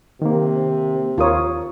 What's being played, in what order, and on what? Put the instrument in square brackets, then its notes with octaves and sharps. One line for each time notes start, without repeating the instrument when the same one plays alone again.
[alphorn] C3 [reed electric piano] D#3 A#3
[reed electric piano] D#2 D#6 [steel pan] F4 A#4 C#5